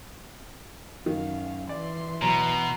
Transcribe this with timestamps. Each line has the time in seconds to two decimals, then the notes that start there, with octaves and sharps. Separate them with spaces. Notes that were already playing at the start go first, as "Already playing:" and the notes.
1.06 F#2 D#3 F5
1.69 E3 D5 C6
2.22 B2 F#3 A#5